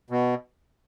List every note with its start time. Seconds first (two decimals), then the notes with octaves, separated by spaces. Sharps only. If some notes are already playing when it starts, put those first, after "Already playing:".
0.10 B2